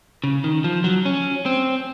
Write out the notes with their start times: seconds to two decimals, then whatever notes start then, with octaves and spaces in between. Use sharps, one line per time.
0.24 C#3
0.44 D#3
0.64 F3
0.84 F#3
1.05 C#4
1.46 C4